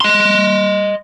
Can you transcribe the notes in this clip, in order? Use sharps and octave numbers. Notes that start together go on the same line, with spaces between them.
D#5 C6